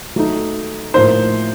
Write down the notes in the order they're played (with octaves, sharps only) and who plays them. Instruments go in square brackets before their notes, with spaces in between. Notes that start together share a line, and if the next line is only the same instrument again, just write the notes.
[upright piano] F#3 A3 D#4
[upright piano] A2 F3 A#3 D#4 [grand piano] C5